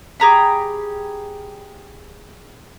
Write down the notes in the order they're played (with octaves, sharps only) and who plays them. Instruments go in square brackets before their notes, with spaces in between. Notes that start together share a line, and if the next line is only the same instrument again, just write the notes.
[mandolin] G4 G#4 A#5 B5